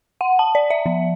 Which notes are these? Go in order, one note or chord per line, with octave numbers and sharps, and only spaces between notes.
F#5
A5
D5
E5
F3